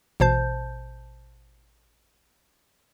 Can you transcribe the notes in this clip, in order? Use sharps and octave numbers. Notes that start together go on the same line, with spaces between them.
A1 B2 C5 A5 G6